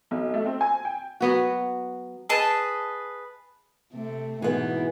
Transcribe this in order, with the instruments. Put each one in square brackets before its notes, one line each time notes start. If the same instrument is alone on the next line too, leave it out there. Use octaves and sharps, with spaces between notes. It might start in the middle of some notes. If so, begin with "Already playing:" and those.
[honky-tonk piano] B1
A3
C4
G#5
G5
[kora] F#3 B3 F#4
[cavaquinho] G#4 B4 D#5 A5
[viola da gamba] C3 A3
[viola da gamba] G#2 B2 [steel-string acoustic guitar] E3 B3